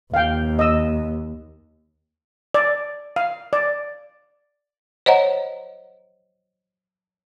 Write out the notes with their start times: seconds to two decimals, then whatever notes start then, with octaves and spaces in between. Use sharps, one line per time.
0.14 D#2 F5 G5
0.59 D#5 E6
2.54 D5
3.16 F5
3.53 D5
5.06 C5 C#5 D#5 F#5 A#5